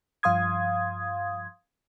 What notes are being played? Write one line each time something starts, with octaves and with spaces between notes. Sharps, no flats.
G2 F3 F5 C6 D#6 G#6